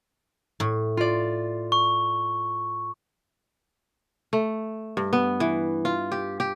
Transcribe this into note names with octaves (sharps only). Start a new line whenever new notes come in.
A2
F4 D5
C#6
A3
G2
B3
E3
F4
G4
G4